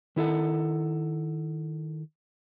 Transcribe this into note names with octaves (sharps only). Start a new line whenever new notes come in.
D#3 E4 A4 F#5